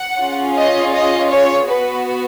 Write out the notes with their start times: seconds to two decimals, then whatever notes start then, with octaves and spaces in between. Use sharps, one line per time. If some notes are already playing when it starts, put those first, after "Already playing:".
Already playing: F#5
0.18 C#4 F4 G#4
0.56 D#5
0.93 D#5
1.30 C#5
1.68 B3 F#4 B4